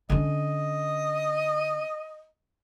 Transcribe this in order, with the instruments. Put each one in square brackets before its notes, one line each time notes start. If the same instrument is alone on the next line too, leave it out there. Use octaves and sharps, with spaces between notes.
[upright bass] D3 C#4 [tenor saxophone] D#5